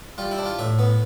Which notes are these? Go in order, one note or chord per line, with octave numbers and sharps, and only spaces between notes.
G3 F4
E4
D4
F4
A2 E5
B3